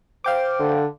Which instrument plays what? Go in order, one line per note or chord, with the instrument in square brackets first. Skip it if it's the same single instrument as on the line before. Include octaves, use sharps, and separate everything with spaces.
[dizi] C5 [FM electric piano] F5 G5 D6
[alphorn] D3